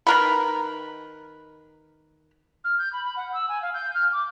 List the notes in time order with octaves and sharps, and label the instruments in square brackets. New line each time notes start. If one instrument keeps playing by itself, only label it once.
[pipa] D#3 A#4 B4
[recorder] F6
G6
B5
B5
F#5
E6
G#5
F5
G6
F6
D6